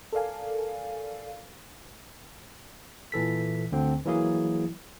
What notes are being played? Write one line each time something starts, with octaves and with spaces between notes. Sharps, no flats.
A4 A#4 D5 F5 G#5
A#2 E3 A4 B6
D2 D3 C4
E3 F#3 A#3 E4 G#4